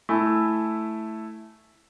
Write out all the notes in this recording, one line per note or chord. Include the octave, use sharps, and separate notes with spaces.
A3 E4 G#5